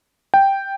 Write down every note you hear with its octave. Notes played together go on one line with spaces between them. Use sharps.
G5